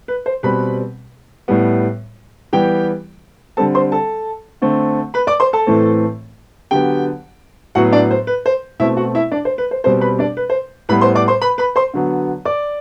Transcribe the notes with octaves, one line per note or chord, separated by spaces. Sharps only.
B4
C5
B2 G3 C4 B4 B5
A2 G3 B3
E3 G3 B3 G4 G5
D3 G3 C4 A4 A5
C5 C6
A4 A5
D3 A3 C4
B4 B5
D5 D6
C5 C6
A4 A5
A2 E3 A3 C4
D3 F#3 B3 G4 G5
A2 F#3 B3 F#4 F#5
D4 D5
C5
B4
C5
B2 A3 C4 E4 E5
F#4 F#5
E4 E5
D4 D5
C5
B4
C5
B2 G3 C4 C5
B4 B5
D4 D5
B4
C5
A2 G3 B3 B4 B5
C5 C6
D5 D6
C5 C6
B4 B5
B4 B5
C5 C6
D3 F#3 B3
D5 D6